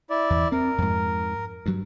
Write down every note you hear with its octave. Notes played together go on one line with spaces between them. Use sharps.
E4 D5
E2
C4 A#4
F2 G#2
G2 F#3